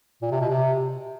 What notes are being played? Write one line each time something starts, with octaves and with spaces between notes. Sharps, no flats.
A#2
C3
B2
C3